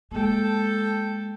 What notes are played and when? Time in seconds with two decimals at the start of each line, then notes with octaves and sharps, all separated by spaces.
0.12 G#3 A#3 A4 G5